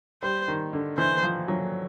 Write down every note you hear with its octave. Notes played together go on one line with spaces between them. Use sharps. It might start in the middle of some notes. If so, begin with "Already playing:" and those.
G3 C5
D#3
D3
E3 C5
F3
F#3